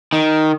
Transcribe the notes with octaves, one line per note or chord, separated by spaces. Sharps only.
D#3